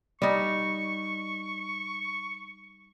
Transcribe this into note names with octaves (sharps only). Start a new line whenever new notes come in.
G3 D#4 C#6